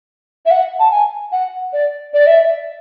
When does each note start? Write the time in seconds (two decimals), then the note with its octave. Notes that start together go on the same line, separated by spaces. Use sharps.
0.46 E5
0.51 F#5
0.79 A5
0.91 G#5
1.32 F#5
1.73 D5
2.14 D5
2.27 E5